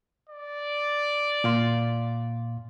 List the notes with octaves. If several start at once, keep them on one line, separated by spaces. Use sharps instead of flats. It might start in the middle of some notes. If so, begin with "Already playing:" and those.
D5
A#2 F5 C6